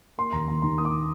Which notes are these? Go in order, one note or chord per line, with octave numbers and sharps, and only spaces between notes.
A#3 C6
D#2 A#5
D#2 A#5
D#3 C6
A#3 D#6
D6
A#3